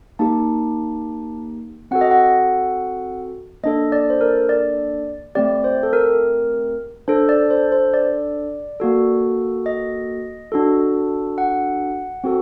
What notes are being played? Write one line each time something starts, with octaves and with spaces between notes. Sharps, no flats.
A#3 D#4 G4 A5
C4 F#4 A4 F#5
D#5
F#5
A#3 D4 A4 D#5
D5
C5
A#4
D5
A3 C4 G4 D5
C5
A4
A#4
D4 A4 C5
D5
C5
C5
D5
A#3 F#4 A4
D#5
D4 F#4 A4
F#5
C4 F#4 A4